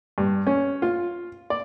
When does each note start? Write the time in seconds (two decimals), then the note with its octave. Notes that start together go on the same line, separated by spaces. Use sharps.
0.18 G2
0.47 C#4
0.82 F4
1.50 D5